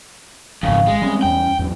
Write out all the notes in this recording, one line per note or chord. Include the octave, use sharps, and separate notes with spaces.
D1 G#1 F2 C#3 F5
G#3
G3 C4 C#4
E2 G3 G5
E2 G2 F#3